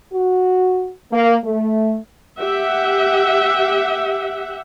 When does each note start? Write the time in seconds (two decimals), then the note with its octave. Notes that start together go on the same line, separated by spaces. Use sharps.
0.13 F#4
1.12 A#3
1.44 A3
2.40 G4 E5 F#5